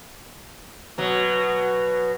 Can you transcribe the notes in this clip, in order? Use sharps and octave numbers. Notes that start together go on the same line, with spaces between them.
B2 F#3